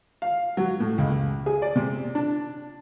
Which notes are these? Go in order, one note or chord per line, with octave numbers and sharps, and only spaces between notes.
F5
F#3
A2
C#2
G#4
D5
C3
D4